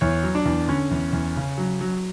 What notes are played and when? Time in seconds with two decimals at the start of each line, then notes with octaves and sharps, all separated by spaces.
0.01 E2 C#5
0.23 F#3
0.35 D4
0.45 E2
0.68 D3 C#4
0.91 E2
1.13 E2
1.36 C#3
1.58 F#3
1.81 F#3